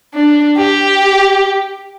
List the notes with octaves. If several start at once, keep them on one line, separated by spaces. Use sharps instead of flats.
D4
G4